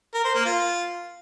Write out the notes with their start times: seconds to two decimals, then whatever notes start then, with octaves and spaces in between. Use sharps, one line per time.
0.14 A#4
0.25 C5
0.35 A#3
0.45 F4